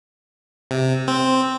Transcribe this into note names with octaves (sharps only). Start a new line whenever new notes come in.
C3
C4